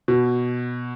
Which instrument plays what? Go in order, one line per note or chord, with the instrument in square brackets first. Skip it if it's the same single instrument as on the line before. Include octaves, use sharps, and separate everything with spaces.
[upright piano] B2